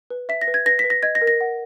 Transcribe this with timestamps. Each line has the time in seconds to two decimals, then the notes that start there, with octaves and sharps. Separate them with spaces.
0.11 B4
0.29 E5 B6
0.41 A#6
0.48 B4
0.54 G#6
0.66 B4 A#6
0.79 B6
0.84 B4
0.90 A#6
1.03 D#5 G#6
1.15 A#6
1.22 A#4
1.27 A#6
1.41 F#5